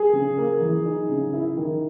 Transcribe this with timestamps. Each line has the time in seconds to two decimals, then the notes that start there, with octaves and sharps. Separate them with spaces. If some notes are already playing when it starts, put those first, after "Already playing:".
Already playing: G#4
0.13 C#3
0.38 A#3
0.61 E3
0.85 D#4
1.09 C#3
1.33 E4
1.57 D#3